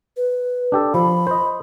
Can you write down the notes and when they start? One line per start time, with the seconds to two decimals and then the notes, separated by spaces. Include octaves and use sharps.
0.17 B4
0.72 D4 G4 A4
0.94 F3 B5
1.27 C5 D#5